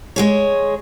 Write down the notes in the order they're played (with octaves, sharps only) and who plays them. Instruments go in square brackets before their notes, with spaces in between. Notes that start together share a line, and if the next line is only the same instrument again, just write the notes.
[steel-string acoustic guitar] G#3 G#4 C#5